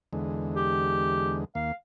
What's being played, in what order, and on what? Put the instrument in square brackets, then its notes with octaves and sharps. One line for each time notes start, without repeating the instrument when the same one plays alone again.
[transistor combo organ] E2 D3 G#3
[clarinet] G4
[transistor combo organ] D#2 A#3 [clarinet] F5